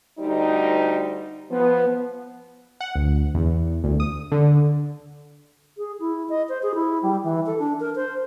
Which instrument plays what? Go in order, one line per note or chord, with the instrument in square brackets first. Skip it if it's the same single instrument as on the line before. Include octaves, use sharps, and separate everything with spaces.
[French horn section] D2 G3 D#4
[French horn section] F3 [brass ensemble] B3
[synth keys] F#5
D2
E2
D2
D#6
D3
[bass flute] G#4
E4
D#5
C5
G#4
E4
G3
E3
A4
D4
A#4
C5